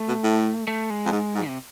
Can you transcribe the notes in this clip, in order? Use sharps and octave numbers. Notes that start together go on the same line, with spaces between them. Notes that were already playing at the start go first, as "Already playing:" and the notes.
Already playing: A3
B2
A2
A3
G#3
F2
G#2
G#2
C3